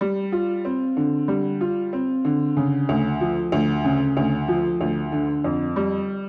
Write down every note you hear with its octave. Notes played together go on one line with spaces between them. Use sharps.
G3
F4
C4
D3
G3
F4
C4
D3
C#3
D2
F3
D2
C#3
D2
F3
D2
D3
F2
G3